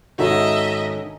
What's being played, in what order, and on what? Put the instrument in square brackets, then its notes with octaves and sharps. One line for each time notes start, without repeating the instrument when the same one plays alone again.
[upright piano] G#2 D#4 F#4 [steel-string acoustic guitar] D#3 C#4 A4 [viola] D#5 E5